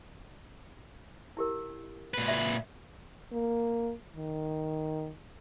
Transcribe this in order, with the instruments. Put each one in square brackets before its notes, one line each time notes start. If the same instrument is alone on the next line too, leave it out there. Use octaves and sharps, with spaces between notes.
[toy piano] E4 G4 A#4
[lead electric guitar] A#2 B4
[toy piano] F#4 D5 E5
[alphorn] A#3
D#3